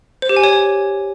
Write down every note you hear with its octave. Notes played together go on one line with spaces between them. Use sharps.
C5
G4
G#5
C#5